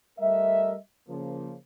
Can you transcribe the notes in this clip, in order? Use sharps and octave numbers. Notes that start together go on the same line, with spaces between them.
G3 A3 A#4 D#5 E5
C#3 F3 A#3